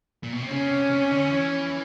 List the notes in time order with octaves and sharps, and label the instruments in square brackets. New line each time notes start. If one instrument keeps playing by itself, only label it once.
[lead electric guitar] A#2
B2
C3
[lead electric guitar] C#3 [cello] C#4
[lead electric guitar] C3
C3
D3
E3